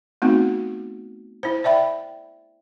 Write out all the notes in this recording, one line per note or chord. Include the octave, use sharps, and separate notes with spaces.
A3 B3 C4 D#4 F#4
E4 C5
D5 E5 G5 B5